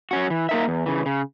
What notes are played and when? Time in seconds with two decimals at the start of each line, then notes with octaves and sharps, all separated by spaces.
0.11 F#3 C#4 F#4
0.30 E3
0.49 A#3 D#4 A#4 E5
0.68 E2
0.86 C#3 E3
1.06 C#3